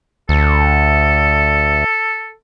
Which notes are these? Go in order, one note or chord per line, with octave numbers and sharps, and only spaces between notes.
D2 A4